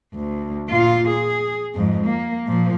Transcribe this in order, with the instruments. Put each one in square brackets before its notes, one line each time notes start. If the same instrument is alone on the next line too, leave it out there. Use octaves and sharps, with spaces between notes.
[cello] D2
A#2 F4
G#4
F2 G#2
A#3
A#2 F3